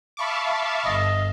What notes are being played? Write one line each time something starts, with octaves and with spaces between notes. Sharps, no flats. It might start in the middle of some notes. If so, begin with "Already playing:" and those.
E5 F5 A5 B5 C#6 D6
G1 D#5